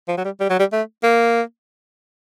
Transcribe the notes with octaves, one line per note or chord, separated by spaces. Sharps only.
F3
F#3
G3
G3
F#3
G3
A3
A#3